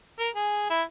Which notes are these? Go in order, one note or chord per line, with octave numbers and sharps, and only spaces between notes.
A#4
G#4
E4